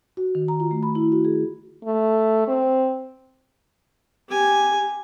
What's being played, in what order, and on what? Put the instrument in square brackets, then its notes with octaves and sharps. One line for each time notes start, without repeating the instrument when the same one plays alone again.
[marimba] F#4
D#3
A#5
F4
A3
B5
E4
F#4
G#4
[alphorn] A3
C4
[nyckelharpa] G4 G#5